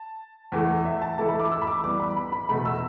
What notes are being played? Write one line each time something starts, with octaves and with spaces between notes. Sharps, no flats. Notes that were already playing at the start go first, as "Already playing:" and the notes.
Already playing: A5
E2 E3 A3
E5
A5
E3 A3 E4 A4 A5
B5
D6
E6
B5
D6
E3 G3 B3 D6
B5
B5
B5
E2 B2 A3 B5
E6